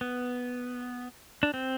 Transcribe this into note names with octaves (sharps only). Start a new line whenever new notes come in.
B3
D4
C4